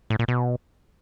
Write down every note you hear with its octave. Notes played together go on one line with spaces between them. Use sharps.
A2
A#2
B2